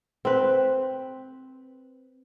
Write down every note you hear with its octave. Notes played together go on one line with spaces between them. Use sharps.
C4 B4